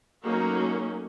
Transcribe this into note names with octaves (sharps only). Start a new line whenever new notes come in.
F#3 A3 A#3 C#4 D#4 F#4